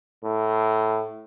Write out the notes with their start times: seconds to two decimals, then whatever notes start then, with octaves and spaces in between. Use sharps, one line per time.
0.24 A2